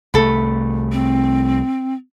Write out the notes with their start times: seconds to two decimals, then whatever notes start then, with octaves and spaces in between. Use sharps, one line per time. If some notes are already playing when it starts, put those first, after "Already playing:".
0.14 C2 A3 A4 B5
0.92 C4